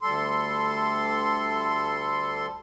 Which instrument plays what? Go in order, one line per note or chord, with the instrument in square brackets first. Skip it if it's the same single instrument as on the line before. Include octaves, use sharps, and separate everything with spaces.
[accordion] D2 G3 A4 C6